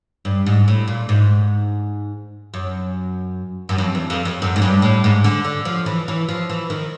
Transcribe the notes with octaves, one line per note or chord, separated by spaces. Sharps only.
G2
G#2
A2
A#2
G#2
F#2
F#2
F2
E2
F2
F2
F#2
G#2
G2
A2
G#2
D3
D3
F3
E3
E3
F3
E3
D#3